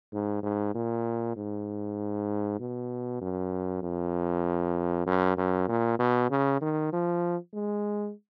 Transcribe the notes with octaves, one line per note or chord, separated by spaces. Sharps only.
G#2
G#2
A#2
G#2
B2
F#2
F2
F#2
F#2
A#2
B2
C#3
D#3
F3
G#3